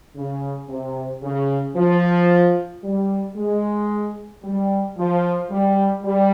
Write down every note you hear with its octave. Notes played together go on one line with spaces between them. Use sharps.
C#3
C3
C#3
F3
G3
G#3
G3
F3
G3
G3